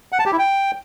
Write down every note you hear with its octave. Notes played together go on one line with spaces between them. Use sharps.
F#5
A5
G4
E4
G5